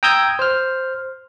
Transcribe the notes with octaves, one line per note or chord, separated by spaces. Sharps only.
G5 A#5 D#6 E6 G6 G#6
C5 F6